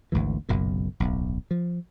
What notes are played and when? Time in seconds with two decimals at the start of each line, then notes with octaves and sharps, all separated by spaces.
0.12 G#1 D2 G#2 E3
0.49 F#1 B1 F#2 A#2
1.00 D1 B1
1.51 F3